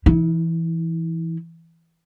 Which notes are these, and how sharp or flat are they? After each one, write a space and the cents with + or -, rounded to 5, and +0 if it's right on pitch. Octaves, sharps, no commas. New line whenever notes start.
E3 +10 E4 -35